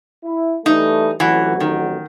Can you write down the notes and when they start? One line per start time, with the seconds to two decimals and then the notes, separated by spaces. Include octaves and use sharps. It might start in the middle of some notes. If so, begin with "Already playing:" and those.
0.24 E4
0.66 E3 G3 A3 D#4
1.20 A1 F2 E3 F#3 F#4
1.60 D#3